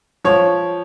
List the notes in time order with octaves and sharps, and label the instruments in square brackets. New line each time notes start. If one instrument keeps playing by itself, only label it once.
[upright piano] F3 C#5